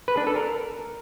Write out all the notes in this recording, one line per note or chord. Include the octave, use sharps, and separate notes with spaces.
B4
D4
A4
A#4